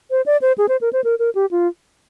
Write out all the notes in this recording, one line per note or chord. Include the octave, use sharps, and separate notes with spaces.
C5
D5
C5
G#4
C5
A#4
C5
A#4
A#4
G4
F4